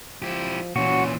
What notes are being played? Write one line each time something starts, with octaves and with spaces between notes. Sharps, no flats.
F3 E4 G4
A#2 E3 C#4 F#4